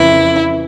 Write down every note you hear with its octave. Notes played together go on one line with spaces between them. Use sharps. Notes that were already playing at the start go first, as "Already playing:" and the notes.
Already playing: F2 C#3 E3 E4